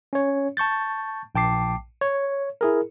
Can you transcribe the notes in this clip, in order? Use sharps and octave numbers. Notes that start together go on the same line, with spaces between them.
C#4 C#5
A5 C#6 G6 A6
A#1 G5 A5 D6 C7
C#5
E4 G#4 A#4